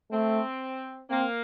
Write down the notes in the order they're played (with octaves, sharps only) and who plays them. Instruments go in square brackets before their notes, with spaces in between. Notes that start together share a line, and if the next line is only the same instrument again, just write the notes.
[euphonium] A3 [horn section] C4
[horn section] A#3 [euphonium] C4